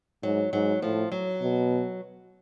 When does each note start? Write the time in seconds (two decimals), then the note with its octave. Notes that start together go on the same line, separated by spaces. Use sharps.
0.23 G#2 F#3
0.53 G#2 F#3
0.82 A2 F3
1.12 F#3
1.41 B2